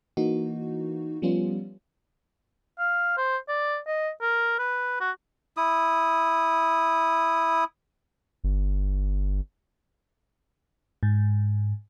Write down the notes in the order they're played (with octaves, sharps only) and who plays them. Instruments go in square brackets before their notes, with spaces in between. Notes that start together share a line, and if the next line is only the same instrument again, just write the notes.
[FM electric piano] E3 A#3 D#4 F#4
F3 G3 B3 C#4 F4
[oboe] F5
C5
D5
D#5
A#4
B4
F#4
[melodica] E4 D#6
[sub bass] G1
[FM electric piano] G#2